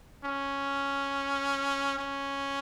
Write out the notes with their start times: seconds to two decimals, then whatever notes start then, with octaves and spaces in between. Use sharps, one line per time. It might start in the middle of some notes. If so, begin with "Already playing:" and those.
0.24 C#4
1.98 C#4